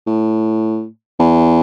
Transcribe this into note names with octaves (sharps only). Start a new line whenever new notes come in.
A2
E2